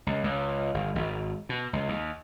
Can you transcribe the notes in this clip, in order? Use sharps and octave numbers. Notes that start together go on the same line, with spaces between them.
C#2
C#2
G1
G#1
B2
C#2
D#2